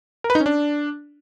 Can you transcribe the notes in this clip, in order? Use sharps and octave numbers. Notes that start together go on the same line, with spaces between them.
A#4
B4
D#4
C#4
D4